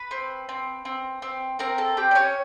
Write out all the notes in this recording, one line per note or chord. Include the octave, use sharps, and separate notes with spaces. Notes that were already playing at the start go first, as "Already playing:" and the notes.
Already playing: B4 B5
C4
C4
C4
C4
C4 A#4 A#5
A4 A5
C4 G4 G5
D5
C#4 C#5